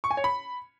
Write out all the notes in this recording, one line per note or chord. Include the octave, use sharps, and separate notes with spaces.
C#6
G#5
C#5
B5